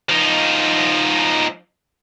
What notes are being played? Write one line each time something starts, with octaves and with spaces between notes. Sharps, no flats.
F3 D#4